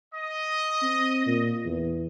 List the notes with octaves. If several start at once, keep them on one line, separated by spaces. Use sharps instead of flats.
D#5
C4
A#2
E2